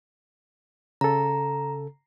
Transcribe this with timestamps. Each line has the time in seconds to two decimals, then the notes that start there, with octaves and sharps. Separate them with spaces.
1.01 C#3 A4 A#5